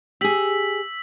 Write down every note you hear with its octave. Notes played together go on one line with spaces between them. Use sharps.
G4 G#4 E6 B6 F#7